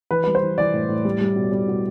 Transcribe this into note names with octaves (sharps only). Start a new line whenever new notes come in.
E3 B4
G3 B4
C5
E3
E3 D5
A2
A2
G3
G3
B2
G3
B2